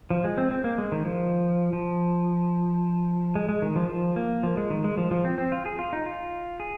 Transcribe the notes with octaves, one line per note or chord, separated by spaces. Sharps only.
F3
G#3
C4
C4
A#3
G#3
D#3
F3
F3
G#3
G#3
D#3
F3
F3
A#3
F3
G#3
D#3
G#3
F3
F3
C4
C4
F4
G#4
F4
D#4
F4
G#4